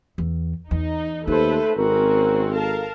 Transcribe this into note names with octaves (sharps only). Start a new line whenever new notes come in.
E2
E2 D#4
D#2 A3 D#4 A4 B4 C5
G#1 C4 C#4 F#4 A#4
A4 A#4 F5 A5